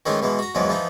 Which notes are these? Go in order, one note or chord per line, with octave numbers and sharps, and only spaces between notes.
D#3 E3 G#3 A3 C#4 D#4
B2 E3 G#3 B3
F#4 A#5
E2 G#2 F3 F#3 G#3 B3
E3 F3 B3 D#4